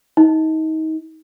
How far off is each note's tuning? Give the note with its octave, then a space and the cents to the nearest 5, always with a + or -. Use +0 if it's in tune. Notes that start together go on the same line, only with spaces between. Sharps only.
D#4 +30